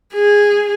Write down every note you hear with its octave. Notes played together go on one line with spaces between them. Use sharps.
G#4